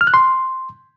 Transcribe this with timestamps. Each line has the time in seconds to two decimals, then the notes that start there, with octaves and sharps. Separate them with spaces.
0.01 F6
0.07 F#6
0.14 C6